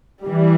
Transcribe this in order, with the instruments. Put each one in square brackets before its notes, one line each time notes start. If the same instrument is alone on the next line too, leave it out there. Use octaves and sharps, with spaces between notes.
[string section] E3 G3